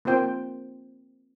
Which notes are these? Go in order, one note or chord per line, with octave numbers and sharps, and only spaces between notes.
A#3 C4 F4 C5 G5